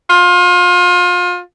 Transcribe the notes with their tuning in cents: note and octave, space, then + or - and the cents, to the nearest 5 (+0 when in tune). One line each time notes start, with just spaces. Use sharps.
F4 +30